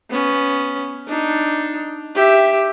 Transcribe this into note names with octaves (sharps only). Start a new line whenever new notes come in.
B3 C#4
D4 D#4
G4 E5